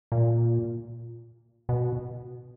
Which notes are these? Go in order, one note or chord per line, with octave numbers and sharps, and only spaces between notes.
A#2
B2